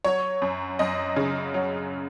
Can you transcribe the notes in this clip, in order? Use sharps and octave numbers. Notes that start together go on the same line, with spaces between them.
F#3 C#5
F#2
F#2 D#5
C#3
F#3